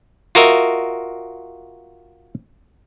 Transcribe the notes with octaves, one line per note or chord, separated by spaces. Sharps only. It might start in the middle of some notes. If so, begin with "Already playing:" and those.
F4 F#4 A#4 D#5 E5